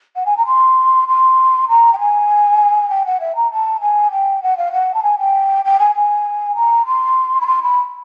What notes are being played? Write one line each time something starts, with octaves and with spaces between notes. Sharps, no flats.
F#5
G#5
A#5
C6
C6
A#5
G5
G#5
G5
F#5
E5
A#5
A5
G#5
G5
F#5
F5
F#5
A5
G#5
G5
G5
G#5
G#5
A#5
C6
B5
C6
B5